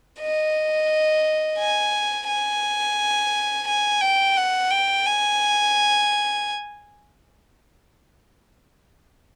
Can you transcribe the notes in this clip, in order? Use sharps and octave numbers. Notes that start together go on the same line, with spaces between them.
D#5
G#5
G#5
G#5
G5
F#5
G5
G#5